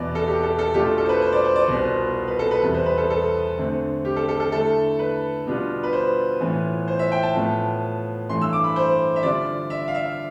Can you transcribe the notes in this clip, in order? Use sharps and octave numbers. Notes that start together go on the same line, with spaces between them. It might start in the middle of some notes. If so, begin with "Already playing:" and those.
Already playing: E2 B2 B3 E4 D5
A4
G4
A4
A4
B2 A3 D4 F4 G4
A4
A4
C5
B4
C5
D5
C5
D5
C2 B2 B3 F4 C5
B4
A4
B4
E2 C3 G3 B3
C5
B4
A4
A4
D3 A3 C4
G4
A4
A4
A4
D3 A3 E4 A4
B4
B2 G3 B3 D4 F4
B4
C5
A2 E3 B3 F4
C5
E5
G5
A5
A2 F3 B3
G2 E3 A3 C6
E6
D6
B5
C5
E5
D3 G3 D4 F4 D5
E5
F5
E5